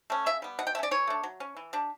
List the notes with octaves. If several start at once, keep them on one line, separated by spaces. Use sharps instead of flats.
A3 C#4
C#3 E5
G3 B3
B2 F#5
G5
A3 E5
C#4 D5
E3 C#5
A3 D4
F#3
C#4
E3
G3 D4